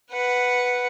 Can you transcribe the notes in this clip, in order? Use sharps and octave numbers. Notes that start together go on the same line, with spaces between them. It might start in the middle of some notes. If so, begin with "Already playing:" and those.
B4 F#5